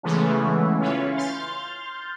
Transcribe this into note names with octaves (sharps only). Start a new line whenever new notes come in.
C#3 E3 G#3 A3 B3 C#4
C#4 E4 F4 B4 C#5
C6 F6 G6 A6